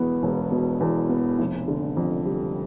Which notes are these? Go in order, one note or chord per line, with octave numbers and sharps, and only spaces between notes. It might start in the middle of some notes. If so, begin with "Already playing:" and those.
Already playing: E1 E2 B2 B3
E1
B2
E2
B3
F1
D3
F2
G3